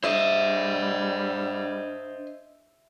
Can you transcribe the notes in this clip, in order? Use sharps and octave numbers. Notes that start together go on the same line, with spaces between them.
G3 D4 C5 D#5 E5